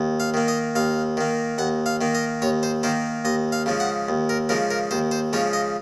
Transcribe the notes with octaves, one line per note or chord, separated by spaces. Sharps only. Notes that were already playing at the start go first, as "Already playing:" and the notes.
Already playing: D#2
F5
D#3 A#3
D#5
D#2 F5
D#3 A#3
D#2 F#5
F5
D#3 A#3
D#5
D#2 C#5
C5
D#3 A#3 C5
D#2 D#5
F5
C#3 F3 G#3
F#5
D#2
A#4
C#3 F3 G#3 A#4
A#4
D#2 C5
C5
C#3 F3 G#3 C#5
D#5